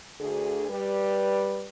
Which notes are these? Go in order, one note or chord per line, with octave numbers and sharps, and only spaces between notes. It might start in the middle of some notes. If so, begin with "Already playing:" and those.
D2 G#4
G3 B4